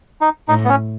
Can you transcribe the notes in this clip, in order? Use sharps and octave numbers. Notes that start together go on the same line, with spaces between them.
D#4
A2 D#4
B3
C#4